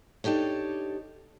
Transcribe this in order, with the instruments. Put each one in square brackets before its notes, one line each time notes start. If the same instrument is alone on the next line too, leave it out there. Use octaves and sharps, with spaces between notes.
[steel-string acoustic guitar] D4 D#4 G4 A4 C#5